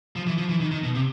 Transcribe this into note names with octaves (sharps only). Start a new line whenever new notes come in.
F3
E3
F3
E3
D#3
D#3
B2
C3